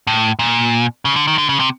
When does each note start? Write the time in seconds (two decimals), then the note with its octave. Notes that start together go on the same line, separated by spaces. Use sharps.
0.07 A2
0.39 A#2
1.05 C#3
1.16 D3
1.28 D#3
1.38 D3
1.49 C#3
1.60 C3